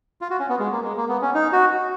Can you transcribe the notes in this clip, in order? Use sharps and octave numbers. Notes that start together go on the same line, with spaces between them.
F4
F#4
C#4
B3
G#3
A#3
G#3
A#3
B3
C#4
D#4
F#4